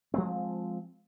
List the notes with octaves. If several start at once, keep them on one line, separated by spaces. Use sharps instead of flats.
F3 G#3 C4